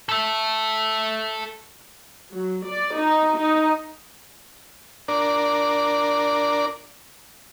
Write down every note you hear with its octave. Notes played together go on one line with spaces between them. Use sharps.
A4 E5
F#3
D5
D#4
D#4
D4 A#4 D5